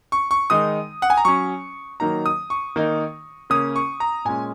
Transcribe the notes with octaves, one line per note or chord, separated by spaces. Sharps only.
C#6
C#6
D#3 G#3 D#4 D#6
F#5
G#5
A#5
F#3 C#4 C#6
D#3 F#3 A#3 D#4 A#5
D#6
C#6
D#3 A#3 D#4
C#3 A#3 C#4 D#6
C#6
A#5
A#2 G#3 C#4 G#5